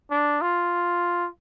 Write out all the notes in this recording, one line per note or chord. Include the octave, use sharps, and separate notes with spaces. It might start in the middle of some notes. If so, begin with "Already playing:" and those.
D4
F4